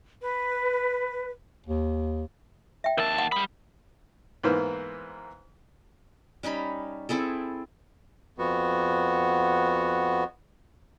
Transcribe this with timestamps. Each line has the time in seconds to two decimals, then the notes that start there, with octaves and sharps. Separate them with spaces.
0.22 B4
1.66 D#2
2.84 E5 G5
2.98 D#2 A#4 A5
3.18 F#5
3.32 G3 B5 D#6
4.43 G#2 E3 A#3 B3 C5 F6
6.43 G3 C#4 D#4 B5
7.09 C4 E4 G#4 A4
8.38 F2 B3 F#4